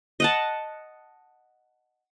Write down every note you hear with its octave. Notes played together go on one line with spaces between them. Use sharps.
D#5 F#5 A5